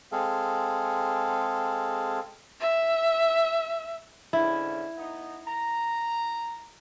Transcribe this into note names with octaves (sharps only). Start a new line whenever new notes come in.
G#3 C4 G#4 A4 F5
E5
G#2 D3 C#4 E4
B3 D#4
A#5